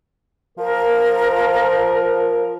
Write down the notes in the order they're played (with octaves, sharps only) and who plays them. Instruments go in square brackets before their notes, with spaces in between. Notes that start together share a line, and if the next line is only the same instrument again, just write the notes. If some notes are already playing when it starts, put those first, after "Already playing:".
[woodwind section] F3 A#4